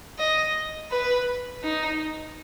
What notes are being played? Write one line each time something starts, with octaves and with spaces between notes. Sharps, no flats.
D#5
B4
D#4